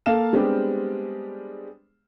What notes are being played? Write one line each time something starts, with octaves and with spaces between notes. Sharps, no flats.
A#3 A4 F5 F6 E7
G3 G#3 B3 C4 D4 G4